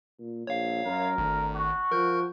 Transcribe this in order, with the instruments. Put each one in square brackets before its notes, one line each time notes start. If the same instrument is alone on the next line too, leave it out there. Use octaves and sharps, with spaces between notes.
[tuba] A#2
[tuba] A#1 [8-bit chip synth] C#5 F5
[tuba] F#2 [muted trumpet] A#4
[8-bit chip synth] G#1 [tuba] D2
[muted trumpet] F#4
[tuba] F3 [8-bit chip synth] A#4 G6